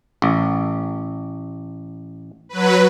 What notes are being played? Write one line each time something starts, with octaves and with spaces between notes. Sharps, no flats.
A1
F#3 B4